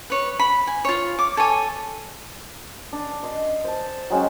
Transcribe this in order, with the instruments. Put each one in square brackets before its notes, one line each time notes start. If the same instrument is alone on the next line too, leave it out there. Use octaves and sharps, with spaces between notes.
[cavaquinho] B4 C#5
B5
G#5
F4 C#5
D6
A4 C#5 G#5
[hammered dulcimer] D4
D#5 C6
C5 A5
F#3 G#3 C#4 G4